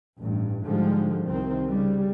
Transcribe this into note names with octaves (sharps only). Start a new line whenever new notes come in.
A1 G2
G#2 D3 F3 G3 G#3
C2 D#3 C4
C#3 G3